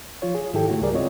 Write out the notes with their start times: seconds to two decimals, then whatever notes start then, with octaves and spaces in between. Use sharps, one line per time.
0.22 F3 F4 C#5
0.35 G#4
0.54 G#2 D#3 E4 G4 A4 G5
0.68 D3 A3 E4 F#4
0.81 C#2 C#3 G3 G#4 A#4 D5
0.93 G#3 C4 F4 C#5 D#5